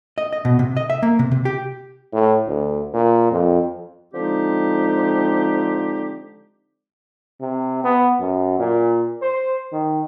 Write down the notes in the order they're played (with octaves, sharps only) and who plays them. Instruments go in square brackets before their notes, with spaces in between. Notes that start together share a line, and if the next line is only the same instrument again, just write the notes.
[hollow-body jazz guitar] D#5
D#5
B2
C3
D#5
E5
A#3
C3
C3
G4
[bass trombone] A2
D2
A#2
F2
[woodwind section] D3 F3 G#3 C4 D#4 G4
[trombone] C3
B3
F#2
A#2
C5
D#3